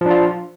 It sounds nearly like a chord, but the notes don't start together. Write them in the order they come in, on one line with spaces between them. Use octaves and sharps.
F3 D4 F4